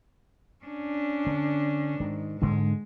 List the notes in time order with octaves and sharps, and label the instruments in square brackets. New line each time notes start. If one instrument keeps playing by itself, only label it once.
[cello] C#4 D4
[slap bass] D3
[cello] G#2 [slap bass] D#3
[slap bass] G#2 D3 D4 [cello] G#3